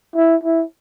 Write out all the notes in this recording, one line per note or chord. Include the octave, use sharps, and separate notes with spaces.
E4
E4